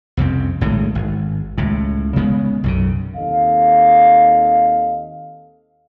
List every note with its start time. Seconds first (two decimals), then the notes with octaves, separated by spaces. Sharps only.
0.17 C2 F2 C#3 C4
0.61 A#1 A2 D#3 G#3
0.95 G#1
1.58 C#2 A2
2.16 C#3 G#3 B3
2.64 B1 F#2 C#3
3.15 D#2 C4 A4 D#5 F5